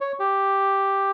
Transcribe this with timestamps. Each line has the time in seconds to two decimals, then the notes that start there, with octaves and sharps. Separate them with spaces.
0.01 C#5
0.19 G4